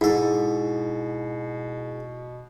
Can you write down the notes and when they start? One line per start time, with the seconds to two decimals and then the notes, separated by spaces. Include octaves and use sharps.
0.01 G#2 B2 E4 A4